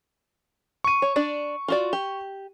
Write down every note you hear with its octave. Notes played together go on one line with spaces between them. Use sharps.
C#6 D#7
C#5
D4 D5
F4 F#4 D5
G4